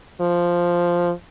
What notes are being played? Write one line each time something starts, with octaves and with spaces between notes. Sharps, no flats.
F3